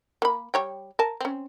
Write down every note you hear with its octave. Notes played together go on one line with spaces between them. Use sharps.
A#3 B5
G3 C#5 G5
A#4 A5
C4 C#4